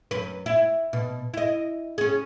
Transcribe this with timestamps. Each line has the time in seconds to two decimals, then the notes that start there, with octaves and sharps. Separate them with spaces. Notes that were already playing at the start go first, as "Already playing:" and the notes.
0.11 F#2 B4
0.46 E4
0.93 B2
1.34 E4 D#5
1.98 C#4 G#4